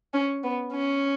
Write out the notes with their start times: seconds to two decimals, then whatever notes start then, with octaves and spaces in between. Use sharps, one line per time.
0.13 C#4
0.43 B3
0.73 C#4